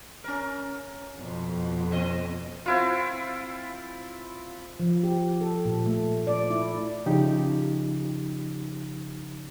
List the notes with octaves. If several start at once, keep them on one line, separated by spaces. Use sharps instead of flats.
C#4 A#4
F2 B2
F3 C4 D#5
C4 E4 F4
F3
G4
A4
A#2
A3
D5
E4
C#3 F3 D#4 G4